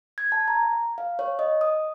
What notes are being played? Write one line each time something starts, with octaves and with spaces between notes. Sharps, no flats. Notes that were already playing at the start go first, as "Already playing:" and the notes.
G#6
A5
A#5
F5
C#5
D#5
D#6